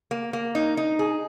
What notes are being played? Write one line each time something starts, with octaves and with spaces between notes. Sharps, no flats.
A#3
A#3
D#4
D#4
G#4